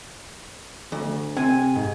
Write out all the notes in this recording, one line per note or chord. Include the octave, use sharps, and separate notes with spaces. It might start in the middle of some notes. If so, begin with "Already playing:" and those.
D2
C3 G#5 D#7
G#2